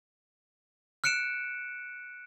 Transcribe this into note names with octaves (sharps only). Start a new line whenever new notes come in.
F6 F#6 C#7 D7 E7